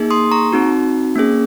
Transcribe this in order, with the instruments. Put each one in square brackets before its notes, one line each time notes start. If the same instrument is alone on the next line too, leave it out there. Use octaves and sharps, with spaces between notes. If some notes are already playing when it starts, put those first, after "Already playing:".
Already playing: [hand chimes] A#3 D#4 G#4
C6 D#6
A#5 C#6
C4 D#4 F#4
A#3 C#4 G#4